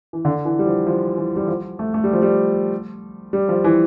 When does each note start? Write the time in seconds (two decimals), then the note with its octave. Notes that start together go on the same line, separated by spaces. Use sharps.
0.13 E3
0.25 D3
0.45 E3
0.59 G3
0.66 F3
0.87 F3
1.17 E3
1.36 G3
1.48 F3
1.79 A3
1.94 A3
2.04 G3
2.13 F3
2.22 G3
3.33 G3
3.49 F3
3.64 E3